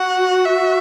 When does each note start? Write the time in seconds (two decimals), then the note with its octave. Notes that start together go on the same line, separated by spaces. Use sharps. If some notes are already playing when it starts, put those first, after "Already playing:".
Already playing: F#4 F#5
0.45 E5